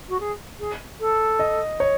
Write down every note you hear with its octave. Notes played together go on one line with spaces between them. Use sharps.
F#4
G#4
G#4
A4
D#5
C#5